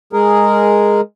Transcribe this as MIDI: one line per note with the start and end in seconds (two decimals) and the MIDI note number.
0.13 1.01 56
0.13 1.01 68
0.13 1.01 70